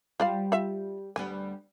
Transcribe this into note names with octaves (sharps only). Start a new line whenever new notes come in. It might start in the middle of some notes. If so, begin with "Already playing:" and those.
G3 F4 G4 C5 D5 F5
F4 E5
D2 G3 B3 G#5